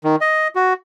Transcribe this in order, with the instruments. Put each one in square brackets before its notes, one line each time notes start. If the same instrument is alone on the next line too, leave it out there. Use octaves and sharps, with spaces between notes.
[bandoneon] D#3
D#5
F#4